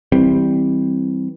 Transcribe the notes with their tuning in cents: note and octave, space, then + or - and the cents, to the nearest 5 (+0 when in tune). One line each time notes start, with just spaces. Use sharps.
E3 -20 G3 +0 C4 +0